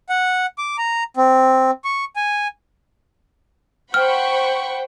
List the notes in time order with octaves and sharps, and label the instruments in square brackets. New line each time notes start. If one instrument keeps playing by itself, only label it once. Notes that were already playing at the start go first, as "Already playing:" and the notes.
[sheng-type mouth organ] F#5
D6
A#5
C4
C#6
G#5
[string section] C5 [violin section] F#5 B5 C#6 [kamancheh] G5 [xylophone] F6